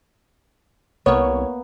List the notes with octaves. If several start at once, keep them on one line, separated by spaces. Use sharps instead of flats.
C2 A#3 B3 C#5